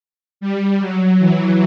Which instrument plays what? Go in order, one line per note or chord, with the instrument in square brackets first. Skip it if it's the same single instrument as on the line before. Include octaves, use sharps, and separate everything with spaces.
[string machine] G3
F#3
E3